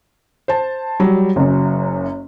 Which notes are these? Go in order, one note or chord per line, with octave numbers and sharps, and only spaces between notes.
C5 A5
F#3 G3
F#1 F#2